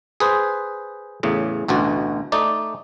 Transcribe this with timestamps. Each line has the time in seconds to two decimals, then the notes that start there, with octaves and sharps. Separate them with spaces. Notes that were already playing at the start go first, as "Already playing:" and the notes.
0.20 G#4 B4 C5
1.23 E2 A2 C#3
1.68 A1 D2 B2 F#4
2.32 A3 D#4 D5